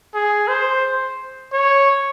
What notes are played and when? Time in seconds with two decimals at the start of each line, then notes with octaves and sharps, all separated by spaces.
0.14 G#4
0.48 C5
1.53 C#5